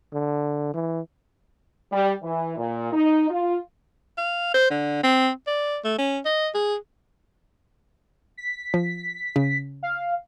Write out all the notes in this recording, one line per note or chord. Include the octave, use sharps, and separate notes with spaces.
D3
E3
G3
E3
A#2
D#4
F4
F5
C5
D3
C4
D5
A3
C#4
D#5
G#4
B6
F3
C#3
F5